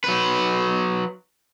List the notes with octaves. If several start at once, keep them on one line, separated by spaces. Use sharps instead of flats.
F#3 B4